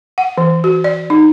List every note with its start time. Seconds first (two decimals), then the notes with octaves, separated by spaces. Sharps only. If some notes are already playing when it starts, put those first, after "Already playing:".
0.18 F#5
0.38 E3
0.64 F#4
0.84 D5
1.10 D#4